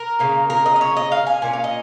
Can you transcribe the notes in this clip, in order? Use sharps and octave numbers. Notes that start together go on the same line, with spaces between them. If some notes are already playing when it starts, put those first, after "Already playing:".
Already playing: A#4
C#3 A#3 D#4
A#4
D#5
D#5
C#5
D#5
F5
G#5
A#2 A#3 C#4 G#5
F5
D#5